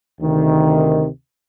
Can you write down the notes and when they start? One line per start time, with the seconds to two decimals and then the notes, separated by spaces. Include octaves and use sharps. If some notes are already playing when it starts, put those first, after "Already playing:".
0.20 D2 C3 D#3